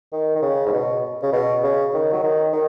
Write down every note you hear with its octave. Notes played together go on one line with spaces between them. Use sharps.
D#3
D#3
C#3
G#2
B2
C#3
B2
C#3
D#3
F#3
D#3
D#3